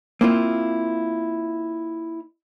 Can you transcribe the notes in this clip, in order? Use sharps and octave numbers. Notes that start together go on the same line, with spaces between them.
A#3 C4 E4 F4